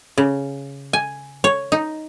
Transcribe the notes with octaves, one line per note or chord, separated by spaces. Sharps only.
C#3
G#5
C#5
D#4